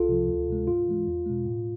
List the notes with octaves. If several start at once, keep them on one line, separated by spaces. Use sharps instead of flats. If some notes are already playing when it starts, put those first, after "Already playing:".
Already playing: C2 F4 A4
C3 F3
D2
C3 G#3
G#2 F4
E3 G#3
E2
B2 G#3
A2